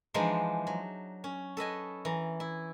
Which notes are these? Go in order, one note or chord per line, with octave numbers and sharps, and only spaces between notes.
E3 F3 G#3 D4 D#4 C5
F#3
C#4
A4 B4 D#5 G#5
E3 A#5
E4